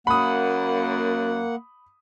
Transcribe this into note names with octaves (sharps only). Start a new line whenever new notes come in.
F#2 A#3 F#5 B5 D#6